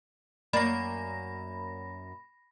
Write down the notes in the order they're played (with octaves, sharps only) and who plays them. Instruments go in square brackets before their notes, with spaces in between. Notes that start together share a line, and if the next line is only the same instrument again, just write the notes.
[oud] F#2 A#3 D5 [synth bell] B5 A#6